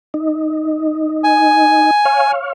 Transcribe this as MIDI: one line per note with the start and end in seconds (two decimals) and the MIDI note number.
0.14 1.91 63
1.24 2.32 80
2.05 2.53 73
2.05 2.53 77